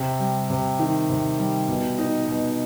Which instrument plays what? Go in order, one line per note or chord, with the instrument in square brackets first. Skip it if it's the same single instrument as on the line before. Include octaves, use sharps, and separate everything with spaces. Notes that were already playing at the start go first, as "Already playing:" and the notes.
Already playing: [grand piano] C3
G3
C3
D#3
C3
G3
B2
D#4
B2